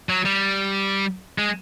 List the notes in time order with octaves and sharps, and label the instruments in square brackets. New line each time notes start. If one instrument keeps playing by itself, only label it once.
[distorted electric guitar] F#3
G3
G#3